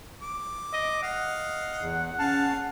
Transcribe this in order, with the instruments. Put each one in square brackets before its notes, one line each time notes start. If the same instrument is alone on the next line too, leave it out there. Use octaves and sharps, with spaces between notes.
[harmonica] D6
[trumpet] D#5
[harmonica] D#5 F5 [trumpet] F#5
[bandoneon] E2
[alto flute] C#4 [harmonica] G#4 F5 [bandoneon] A5